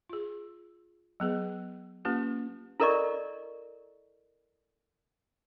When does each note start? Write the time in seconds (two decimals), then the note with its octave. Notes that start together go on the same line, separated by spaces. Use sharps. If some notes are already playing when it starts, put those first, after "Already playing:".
0.09 F4 G#4
1.20 F#3 B3 G#4 B4
2.05 A#3 C#4 F4 G4 B4
2.80 E4 A4 A#4 D5 D#5 C#6